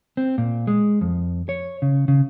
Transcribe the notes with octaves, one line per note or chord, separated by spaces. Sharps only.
C4
A#2
G#3
F2
C#5
C#3
C#3